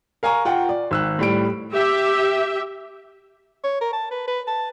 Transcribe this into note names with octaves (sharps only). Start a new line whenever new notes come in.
A#4 F5 G#5 A#5 C#6
F4 F#5 G5
D5
G#1 E6 F#6
A2 G3 D7
G4 E5
C#5
A#4
A5
B4
B4
A5